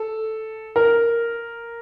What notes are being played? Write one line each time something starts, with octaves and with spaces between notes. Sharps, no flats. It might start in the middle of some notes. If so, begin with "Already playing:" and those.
Already playing: A4
A#4